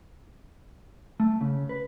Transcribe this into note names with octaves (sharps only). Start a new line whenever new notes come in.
A3
C#3
B4